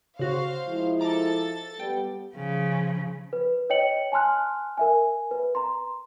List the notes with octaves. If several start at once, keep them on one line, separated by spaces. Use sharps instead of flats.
C#3 F#4 C5 F5
F3 G#3 E4
A4 A#5 D6 A6
G3 B3 G5
C#3 F3
B4
C#5 D#5 G5 C#7 F#7
G#5 A5 C6 F6 F#6
A#4 E5 G#5
B4
A#5 C6